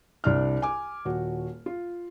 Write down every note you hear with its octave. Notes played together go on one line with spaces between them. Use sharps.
C2 D4 F6
G#5 D6
D#1 F#4
F4